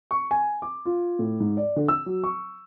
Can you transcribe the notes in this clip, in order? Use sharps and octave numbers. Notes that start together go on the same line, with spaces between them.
C#6
G#5
D6
F4
A2
G#2
D5
D3
E6
F#3
C#6